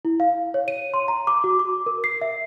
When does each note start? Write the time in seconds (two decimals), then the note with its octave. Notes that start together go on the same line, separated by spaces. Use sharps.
0.05 E4
0.20 F5
0.54 C#5
0.68 D#7
0.94 C6
1.08 A#5
1.27 D6
1.44 F#4
1.59 D6
1.86 A#4
2.04 C7
2.22 E5